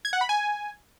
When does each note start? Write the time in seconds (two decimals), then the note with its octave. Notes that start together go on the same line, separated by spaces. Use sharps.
0.05 G#6
0.13 F#5
0.21 B5
0.29 G#5